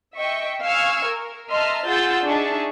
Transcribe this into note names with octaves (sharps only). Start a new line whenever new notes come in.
D#5 E5 G5 C#6
F5 G#5 C#6 E6 F6 G#6
A#4
D#5 E5 A5 A#5 C6 F6
F4 G#4 F#5 E6 G6 A6
D4 D#4 G#4 E5 A5 C#6